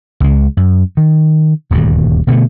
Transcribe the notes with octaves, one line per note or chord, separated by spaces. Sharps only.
C#2 G#3
F#2
D#3
D#1 D2 G2
B2 D3 E3 A3